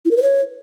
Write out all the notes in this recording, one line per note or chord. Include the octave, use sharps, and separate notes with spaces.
E4
A#4
B4
C#5